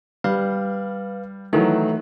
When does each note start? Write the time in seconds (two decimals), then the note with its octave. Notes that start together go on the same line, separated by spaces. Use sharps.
0.24 G3 B4 F5
1.53 D#3 E3 F#3 A3